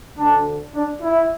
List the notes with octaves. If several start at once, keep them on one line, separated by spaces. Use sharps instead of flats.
D2 D3 D4
D4
E4